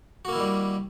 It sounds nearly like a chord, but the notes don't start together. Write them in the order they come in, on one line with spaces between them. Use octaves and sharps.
F#4 A#3 E4 D#3 G3